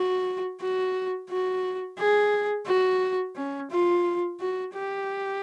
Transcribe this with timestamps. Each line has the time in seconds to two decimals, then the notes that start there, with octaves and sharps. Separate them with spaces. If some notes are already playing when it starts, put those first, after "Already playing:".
Already playing: F#4
0.60 F#4
1.30 F#4
1.98 G#4
2.67 F#4
3.36 C#4
3.71 F4
4.40 F#4
4.73 G4